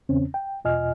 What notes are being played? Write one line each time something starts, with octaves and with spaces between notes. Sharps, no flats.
E2 C#3 C4 C#4
G5
E2 B2 F4 D#5 G#5 F6